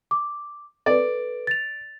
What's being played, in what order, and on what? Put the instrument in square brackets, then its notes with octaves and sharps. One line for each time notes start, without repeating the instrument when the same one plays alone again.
[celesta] D6
[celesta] A4 B4 [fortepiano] D5
[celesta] A6 F7